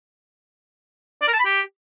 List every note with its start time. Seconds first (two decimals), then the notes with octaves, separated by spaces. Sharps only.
1.22 D5
1.27 A#4
1.33 A5
1.39 B5
1.45 G4